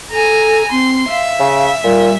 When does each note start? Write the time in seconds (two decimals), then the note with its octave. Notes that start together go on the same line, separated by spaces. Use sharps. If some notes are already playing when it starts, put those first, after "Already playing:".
0.11 A4 G#5 A#5
0.71 C4 C6
1.09 E5 F5
1.40 C#3
1.84 A#2 G3